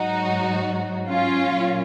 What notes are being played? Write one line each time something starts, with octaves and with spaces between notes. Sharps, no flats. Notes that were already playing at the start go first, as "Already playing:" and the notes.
Already playing: G#2 F#3 D#4 F#4
C#4 F4
A#2 F#3